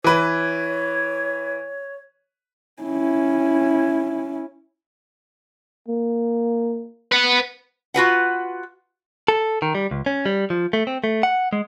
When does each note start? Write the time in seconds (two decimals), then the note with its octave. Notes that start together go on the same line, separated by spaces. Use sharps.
0.04 E3 B4 C#5
2.83 C#4 E4
5.88 A#3
7.12 B4 F#5
7.94 F4 F#4 B4 F#5
9.28 A4
9.62 D#3
9.75 G3
9.91 C#2
10.06 C#4
10.26 G3
10.50 F3
10.73 A3
10.87 C4
11.04 A3
11.23 F#5
11.53 G#3